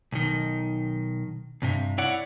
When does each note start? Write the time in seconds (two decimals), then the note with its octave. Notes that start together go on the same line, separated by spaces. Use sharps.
0.12 B1 D#3
1.62 C2 G2 C3
1.98 E4 C#5 D5 F#5